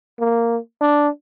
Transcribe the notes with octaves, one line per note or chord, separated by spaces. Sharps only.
A#3
D4